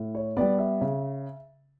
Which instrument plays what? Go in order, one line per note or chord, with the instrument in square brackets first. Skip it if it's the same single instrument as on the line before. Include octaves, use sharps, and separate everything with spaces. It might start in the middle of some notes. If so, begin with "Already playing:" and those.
Already playing: [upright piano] A2
[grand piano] C#5
[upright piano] G3 B3 [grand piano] D5
[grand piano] E5
[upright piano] C#3